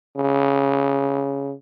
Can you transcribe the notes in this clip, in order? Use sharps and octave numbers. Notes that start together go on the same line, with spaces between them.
C#3